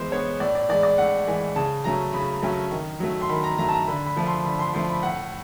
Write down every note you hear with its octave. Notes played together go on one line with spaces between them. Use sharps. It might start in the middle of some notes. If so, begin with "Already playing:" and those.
Already playing: E3 G#3 B3 B4 C5
G#3 B3 C#5
A2 D5
D5
E3 G#3 D5
D5
A2 F#5
E3 G#3 G#5
C#3 A5
F#3 A3 C#4 A#5
C#3 B5
F#3 A3 C#4
D#3
F#3 A3
C6
D#3 B5
A#5
F#3 A3 A#5
A5
A#5
D3 B5
B5
F3 A3
C6
D3 B5
C6
F3 A3 C6
B5
A2 F#5